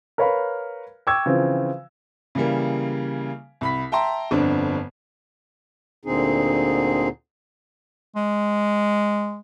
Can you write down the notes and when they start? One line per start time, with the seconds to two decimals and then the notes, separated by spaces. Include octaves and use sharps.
0.18 A#4 B4 C#5 F5 B5
1.07 G5 C#6 D6 E6 G#6
1.26 C#3 E3 F3 C4
2.35 C#3 E3 G3 A#3
3.61 C2 B5 B6
3.92 E5 G5 A5 A#5 C6
4.31 G1 F2 D3 C4 D4
6.05 D2 A#2 D3 C4 D#4 G#4
8.16 G#3